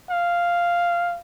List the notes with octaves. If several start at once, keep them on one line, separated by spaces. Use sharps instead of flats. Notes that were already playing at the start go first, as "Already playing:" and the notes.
F5